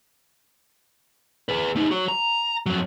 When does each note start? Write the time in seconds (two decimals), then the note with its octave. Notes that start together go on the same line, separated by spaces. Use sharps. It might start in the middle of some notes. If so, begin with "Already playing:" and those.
1.49 G#4 B4
1.76 A3 D#4
1.91 F#4 C#5
2.08 A#5
2.66 F2 F#3